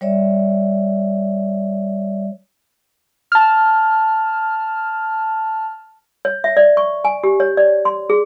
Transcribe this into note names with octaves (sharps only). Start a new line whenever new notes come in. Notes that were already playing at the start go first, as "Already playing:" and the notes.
G3 C#5 D5 E5
A5 F6
C#5
E5
D5
C#6
G#5
G4
C#5
D5
C6
G#4